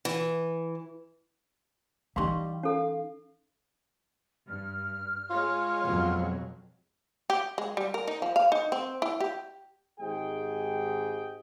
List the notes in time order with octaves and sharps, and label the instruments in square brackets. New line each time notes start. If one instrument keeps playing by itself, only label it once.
[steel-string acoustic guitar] E3
[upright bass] E3 D#4 [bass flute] G3 [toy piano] F5 C6 C#6
[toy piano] C#4 A4 [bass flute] F5
[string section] G2 [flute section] F6
[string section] G#3 C#5 [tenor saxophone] F4
[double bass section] F2 B2 F#3
[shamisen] G4
G#3
G3
A#4
D#4
F3
F5
D#4
C4
E4
G4
[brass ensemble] G#1 G#2 G4 G#4 G5